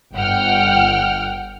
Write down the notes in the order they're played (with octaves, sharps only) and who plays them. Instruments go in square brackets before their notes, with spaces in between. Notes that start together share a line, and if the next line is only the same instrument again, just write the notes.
[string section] G1 F#5 G5 F6